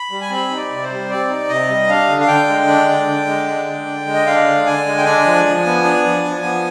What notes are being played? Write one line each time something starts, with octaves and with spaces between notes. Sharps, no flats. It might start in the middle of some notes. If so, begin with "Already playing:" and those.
Already playing: B5
G3
G#5
C4 B5
D#4
D5
C3
C5
G3
C4 D5
D#4
C3 D#5
G3
D4 F5
D3
F5
D3 G5
G#3
D4
D3
D3
G#3
D4
D3
D3
G#3
D#5
D4 F5
D3
D3 G#5
G#3
G5
D4 G#5
F3
F3
B3
D4
F3
F3
B3